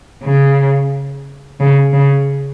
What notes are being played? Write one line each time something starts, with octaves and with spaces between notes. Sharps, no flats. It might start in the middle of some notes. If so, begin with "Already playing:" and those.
C#3
C#3
C#3